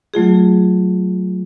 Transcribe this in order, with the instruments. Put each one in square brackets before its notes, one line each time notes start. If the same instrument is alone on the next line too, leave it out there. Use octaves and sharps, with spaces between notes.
[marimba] F#3 A3 F4 G#4